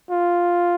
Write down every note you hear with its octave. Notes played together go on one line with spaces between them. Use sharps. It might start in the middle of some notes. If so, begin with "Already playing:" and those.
F4